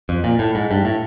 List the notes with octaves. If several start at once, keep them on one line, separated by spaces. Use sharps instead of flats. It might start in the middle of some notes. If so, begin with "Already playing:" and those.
F2
A#2
A2
G#2
G2
A2